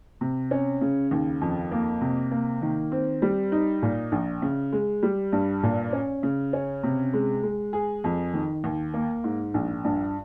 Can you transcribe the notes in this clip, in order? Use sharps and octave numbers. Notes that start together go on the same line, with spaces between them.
C3
C#4
C#3
D#2
F2
A#3
C3
A#3
D#3
C4
G3
D#4
A#2
A#1
C#3
G#3
G3
G2
A#2
C#4
C#3
C#4
C3
G#3
G#3
G#4
F2
D#3
D#2
A#3
G#2
A#1
G2